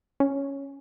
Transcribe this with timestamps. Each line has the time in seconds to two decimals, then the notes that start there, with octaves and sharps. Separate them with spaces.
0.20 C#4